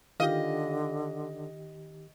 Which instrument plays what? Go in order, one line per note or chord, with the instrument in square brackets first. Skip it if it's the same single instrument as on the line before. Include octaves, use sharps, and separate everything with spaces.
[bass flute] D3 [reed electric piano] D#3 G4 [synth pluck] F4 F5 [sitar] D#5